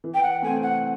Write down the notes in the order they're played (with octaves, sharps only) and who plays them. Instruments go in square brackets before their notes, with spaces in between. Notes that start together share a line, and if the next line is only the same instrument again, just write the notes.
[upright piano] E3
[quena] G5
F#5
[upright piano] A3 C4 [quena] G#5
[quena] F#5